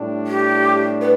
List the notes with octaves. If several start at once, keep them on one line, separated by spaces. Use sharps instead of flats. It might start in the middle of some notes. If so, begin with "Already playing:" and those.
Already playing: A2 G3 D4
G4
B4